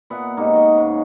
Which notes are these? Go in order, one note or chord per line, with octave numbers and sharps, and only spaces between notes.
A#2 B3 E5 F#5
G#2 C3 A#3 D#4
C#5 D#5 F#5
G#2 C#3